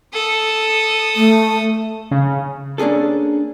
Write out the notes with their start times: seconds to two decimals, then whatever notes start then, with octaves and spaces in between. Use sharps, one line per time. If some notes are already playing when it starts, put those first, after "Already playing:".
0.13 A4 D#6
1.16 A3
2.11 C#3
2.78 A#3 C#4 D4 G#4 A4